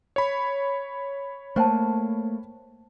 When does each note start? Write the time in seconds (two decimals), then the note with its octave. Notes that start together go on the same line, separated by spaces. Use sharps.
0.16 C#5 B5
1.56 A3 A#3 C5 G5 A5